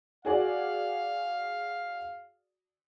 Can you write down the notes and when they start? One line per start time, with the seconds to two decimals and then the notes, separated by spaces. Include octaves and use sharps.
0.25 F#4 G#4 D5 F5